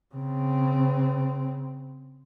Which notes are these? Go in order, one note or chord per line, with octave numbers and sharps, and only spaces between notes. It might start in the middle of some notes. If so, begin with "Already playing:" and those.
C#3 C4